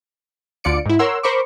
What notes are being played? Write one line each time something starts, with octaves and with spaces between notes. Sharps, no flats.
D2 D3 F4 D5 C#7 D7
G#2 E4
A#4 C#5 F#5 C6 E6
A#4 C5 B5 C#6 D6